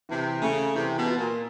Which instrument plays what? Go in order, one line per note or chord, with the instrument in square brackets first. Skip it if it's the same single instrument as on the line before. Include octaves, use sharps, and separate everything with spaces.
[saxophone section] C3 [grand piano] E3
[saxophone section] C#3 [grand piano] A3
[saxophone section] C3 [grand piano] E3
[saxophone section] B2
[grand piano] F4
[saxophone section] A#2